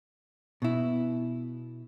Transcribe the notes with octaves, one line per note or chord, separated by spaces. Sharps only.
B2 E4